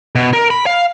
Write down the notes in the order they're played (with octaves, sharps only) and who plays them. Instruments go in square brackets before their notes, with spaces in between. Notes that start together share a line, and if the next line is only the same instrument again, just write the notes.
[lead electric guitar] B2
A#4
B5
F5